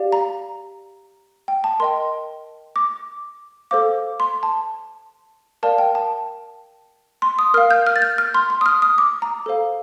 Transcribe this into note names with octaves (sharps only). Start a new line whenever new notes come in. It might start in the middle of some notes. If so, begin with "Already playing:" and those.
Already playing: G4 D5 F5
A#5
G5
A5
A#4 D#5 G5 C6
D6
A4 C5 F5 D6
C6
A5
A#4 D5 F5 A5
G5
A5
C6
D#6
A#4 F5 F6
G6
F6
A6
G6
F6
C6
C6
D#6
F6
D#6
D6
A#5
A4 C5 F5